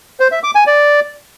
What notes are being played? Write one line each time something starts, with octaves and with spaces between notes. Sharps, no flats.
C5
E5
D6
G#5
D5